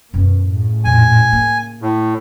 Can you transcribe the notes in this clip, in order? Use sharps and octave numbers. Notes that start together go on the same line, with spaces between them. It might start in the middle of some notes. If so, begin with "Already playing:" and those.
F#2 B2 C#4
A2 C#3
F2 A#2 G#5
A#3
A2